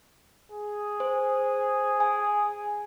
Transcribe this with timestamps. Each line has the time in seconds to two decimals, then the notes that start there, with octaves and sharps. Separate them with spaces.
0.52 G#4
1.00 C5
2.00 G#5